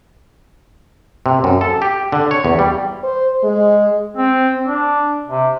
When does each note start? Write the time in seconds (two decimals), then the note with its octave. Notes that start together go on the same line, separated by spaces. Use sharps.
1.26 C3
1.44 F#2
1.61 A4
1.82 G4
2.12 D3
2.31 C#5
2.45 E2
2.59 G3
3.04 C5
3.44 G#3
4.17 C4
4.65 D4
5.28 C3